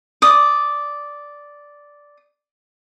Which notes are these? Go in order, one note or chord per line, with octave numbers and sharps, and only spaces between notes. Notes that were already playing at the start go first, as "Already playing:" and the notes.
D5 D#6